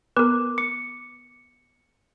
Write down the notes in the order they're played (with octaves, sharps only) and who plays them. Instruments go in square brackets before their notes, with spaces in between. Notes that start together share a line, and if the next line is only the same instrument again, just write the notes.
[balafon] B3 [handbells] A#4 B4 [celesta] D6
[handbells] D6 [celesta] C#7